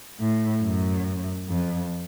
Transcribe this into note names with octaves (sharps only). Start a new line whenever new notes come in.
A2
F#2
F2